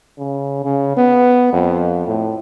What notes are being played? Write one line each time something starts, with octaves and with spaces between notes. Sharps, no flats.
C#3
C#3
B3
F2
A2